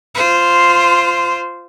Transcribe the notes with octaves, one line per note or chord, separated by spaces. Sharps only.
F4 C5